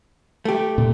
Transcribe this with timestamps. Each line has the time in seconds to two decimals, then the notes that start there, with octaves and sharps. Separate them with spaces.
0.45 A3 G4
0.78 A#2 A#3